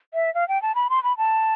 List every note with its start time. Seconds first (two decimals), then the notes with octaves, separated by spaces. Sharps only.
0.14 E5
0.35 F5
0.48 G5
0.62 A5
0.75 B5
0.90 C6
1.03 B5
1.18 A5